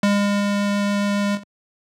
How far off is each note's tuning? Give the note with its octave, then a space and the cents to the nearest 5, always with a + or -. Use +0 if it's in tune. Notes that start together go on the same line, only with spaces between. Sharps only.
G#3 -40